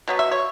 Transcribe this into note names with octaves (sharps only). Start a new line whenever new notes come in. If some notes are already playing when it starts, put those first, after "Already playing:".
B2 F#3 B3
E5
C#5